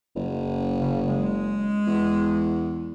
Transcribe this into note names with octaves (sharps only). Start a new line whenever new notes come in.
F#1
C#3
G#3
E2